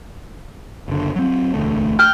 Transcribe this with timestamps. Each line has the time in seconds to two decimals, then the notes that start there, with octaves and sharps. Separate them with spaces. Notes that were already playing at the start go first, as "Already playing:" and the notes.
0.88 F#1 D3
1.16 F#3 C4
1.54 E1 D2 A3
1.99 G5 F6